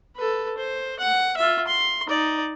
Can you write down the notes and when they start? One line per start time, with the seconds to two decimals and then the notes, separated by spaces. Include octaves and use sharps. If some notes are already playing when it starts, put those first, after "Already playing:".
0.16 A4 B4
0.58 C5
1.00 F#5
1.37 F4 E5
1.68 C6
2.08 D#4 D5